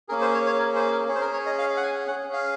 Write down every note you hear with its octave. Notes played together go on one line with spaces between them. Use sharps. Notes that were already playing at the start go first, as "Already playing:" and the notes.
A#3 C#4 G#4 A#4
C5
C#5
C#5
A#4
C5
A#4
C#4 G#4
C5
A#4
C#5
D#5
F5
F#5
G#5
C#4 G#4 F#5
F5